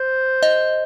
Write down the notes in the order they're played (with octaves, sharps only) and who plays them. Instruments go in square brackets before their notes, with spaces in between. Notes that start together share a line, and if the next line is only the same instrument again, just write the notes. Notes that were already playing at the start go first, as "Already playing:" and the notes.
Already playing: [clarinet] C5
[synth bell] D#5